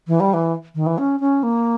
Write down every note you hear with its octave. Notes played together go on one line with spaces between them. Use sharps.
E3
G3
E3
D#3
E3
C#4
C#4
A#3